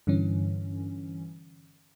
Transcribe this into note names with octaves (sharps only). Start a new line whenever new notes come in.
G2 D3 E3 C#4